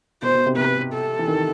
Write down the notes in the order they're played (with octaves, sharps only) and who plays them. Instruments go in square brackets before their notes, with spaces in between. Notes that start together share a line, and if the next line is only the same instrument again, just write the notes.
[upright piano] B2 [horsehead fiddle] C5
[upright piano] B2
C3
[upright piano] C3 [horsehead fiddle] B4
[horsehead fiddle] A4
[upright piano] E3
D#3